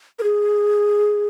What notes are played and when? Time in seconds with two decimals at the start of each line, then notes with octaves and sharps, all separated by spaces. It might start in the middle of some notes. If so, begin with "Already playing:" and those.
0.19 A#4
0.23 G#4